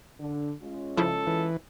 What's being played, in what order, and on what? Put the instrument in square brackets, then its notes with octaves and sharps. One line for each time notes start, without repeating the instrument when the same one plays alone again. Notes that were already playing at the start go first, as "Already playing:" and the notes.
[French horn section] D3
G#3 C#4 F4
[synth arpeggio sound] C#3 F3 E4 [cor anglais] A4
[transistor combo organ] E3